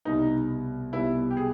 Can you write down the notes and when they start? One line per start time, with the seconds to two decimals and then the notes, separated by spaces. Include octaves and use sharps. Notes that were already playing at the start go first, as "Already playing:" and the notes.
0.05 C2 B2 G3 B3 D#4
0.93 C2 B2 G3 B3 E4
1.30 G4
1.37 G#4